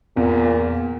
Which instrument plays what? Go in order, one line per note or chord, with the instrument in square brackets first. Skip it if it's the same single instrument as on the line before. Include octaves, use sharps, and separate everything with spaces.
[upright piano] E2 [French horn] A#2